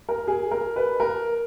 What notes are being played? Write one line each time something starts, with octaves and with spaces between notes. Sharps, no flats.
A#4
G#4
A#4
B4
A#4